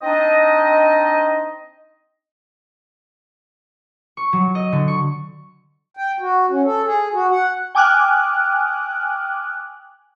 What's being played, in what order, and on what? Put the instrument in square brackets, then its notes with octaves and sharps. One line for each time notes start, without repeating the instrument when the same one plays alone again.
[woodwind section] C4 D4 D#4 D#5
[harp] C#6
F#3
D#5
D3
C#6
[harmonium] G5
F#4
C#4
A4
G#4
F#4
F#5
[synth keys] G5 G#5 D6 D#6 F6 F#6